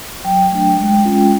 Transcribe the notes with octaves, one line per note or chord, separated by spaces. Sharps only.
F#3 G5
A3 D4
G#3
C#4 F4